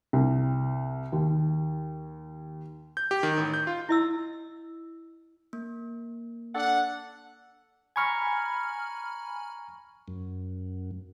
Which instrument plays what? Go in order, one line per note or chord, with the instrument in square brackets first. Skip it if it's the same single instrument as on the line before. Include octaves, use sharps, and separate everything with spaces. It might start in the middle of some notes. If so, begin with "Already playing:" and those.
[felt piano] C2
D#2
[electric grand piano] G6
G4
D#3
A1
G6
F4
[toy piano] E4 D#5 E6
[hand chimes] A#3
[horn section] D4 A4 F#5
[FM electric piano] G#5 B5 F6 [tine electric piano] A#5 C#6 G#6
[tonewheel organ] F#2